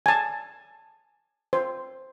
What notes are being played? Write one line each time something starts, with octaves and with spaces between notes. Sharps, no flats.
G#5 A5
C5